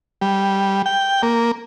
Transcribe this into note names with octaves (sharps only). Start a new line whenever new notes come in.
G3
G5
A#3